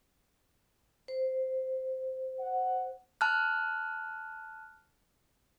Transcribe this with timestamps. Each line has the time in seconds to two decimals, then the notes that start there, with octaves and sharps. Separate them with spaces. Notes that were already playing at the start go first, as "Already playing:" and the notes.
1.08 C5
2.40 F#5
3.21 A5 F6 F#6